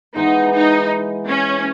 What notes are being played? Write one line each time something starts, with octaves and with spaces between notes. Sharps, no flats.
E3 G#3 B3 D#4
D#4
C#4